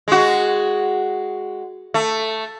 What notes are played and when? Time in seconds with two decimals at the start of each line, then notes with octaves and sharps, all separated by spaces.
0.08 G#3 F#4
1.94 A3